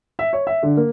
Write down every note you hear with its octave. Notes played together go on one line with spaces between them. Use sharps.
E5
C#5
E5
D3
A#3